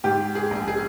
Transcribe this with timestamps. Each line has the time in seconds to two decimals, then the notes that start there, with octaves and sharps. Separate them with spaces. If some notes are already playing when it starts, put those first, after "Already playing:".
0.04 G#2 G4
0.35 G#4
0.51 A#1
0.68 G#4